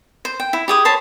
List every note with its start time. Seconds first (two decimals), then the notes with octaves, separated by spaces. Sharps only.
0.25 C5
0.40 G5
0.53 E4
0.68 G4 G#4 D#6
0.85 C5 C#5 A5 B5